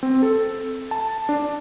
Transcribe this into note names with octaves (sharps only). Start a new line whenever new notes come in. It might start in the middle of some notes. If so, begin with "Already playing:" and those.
C4
A4
A5
D4